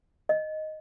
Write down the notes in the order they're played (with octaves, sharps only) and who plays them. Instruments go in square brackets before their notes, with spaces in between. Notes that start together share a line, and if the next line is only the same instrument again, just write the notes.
[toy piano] D#5